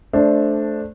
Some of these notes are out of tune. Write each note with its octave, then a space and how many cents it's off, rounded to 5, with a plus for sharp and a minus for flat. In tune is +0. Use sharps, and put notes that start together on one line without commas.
A3 -15 D4 +0 C5 +0